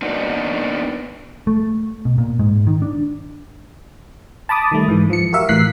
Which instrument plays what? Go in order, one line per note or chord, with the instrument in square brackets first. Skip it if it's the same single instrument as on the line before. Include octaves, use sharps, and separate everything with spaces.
[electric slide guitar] A#3 B3 D4 D#4 F#4
[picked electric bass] A3
B2
A#2
G#2
D#3
D4
[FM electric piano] A5 B5 D6 D#6
D#3 G3 A3
G#2 E3
F3 C#7
F#4 G4 A#4 E5 F5
A2 E3 F#6 B6 C7